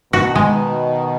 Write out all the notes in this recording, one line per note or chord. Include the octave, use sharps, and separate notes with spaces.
B2 D#3 F#4
G#3